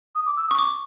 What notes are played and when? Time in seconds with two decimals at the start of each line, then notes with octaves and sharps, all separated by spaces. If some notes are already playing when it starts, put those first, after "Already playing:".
0.15 D#6
0.26 D6
0.37 E6
0.48 D#6
0.51 C#6
0.59 D6